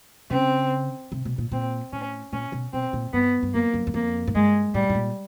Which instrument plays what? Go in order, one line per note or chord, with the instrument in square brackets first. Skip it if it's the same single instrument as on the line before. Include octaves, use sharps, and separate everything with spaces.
[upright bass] C#3 [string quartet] C4
[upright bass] C3
B2
A#2
[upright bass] A#2 [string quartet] C4
[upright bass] A2 [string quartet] C#4
[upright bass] A#2 [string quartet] C#4
[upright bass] B2
[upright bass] B2 [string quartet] C4
[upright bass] A#2
[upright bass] G2 [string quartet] B3
[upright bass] G2
[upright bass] F#2 [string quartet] A#3
[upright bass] F#2
F#2
[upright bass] F2 [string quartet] A#3
[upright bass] G#2
[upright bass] G2 [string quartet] G#3
[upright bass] A2 [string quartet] G3
[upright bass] A2
A#2